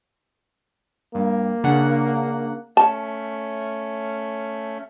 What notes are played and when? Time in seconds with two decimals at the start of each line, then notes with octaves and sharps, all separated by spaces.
1.15 G2 A#3
1.64 C#3 D4 F#5
2.77 A3 C#4 A5